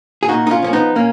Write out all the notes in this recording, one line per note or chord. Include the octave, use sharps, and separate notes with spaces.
G#4
A#2 D#4 F#4
D#4
C#4 F4
F3 A#3 C#4
B3 D#4
A#2 A#3 C#4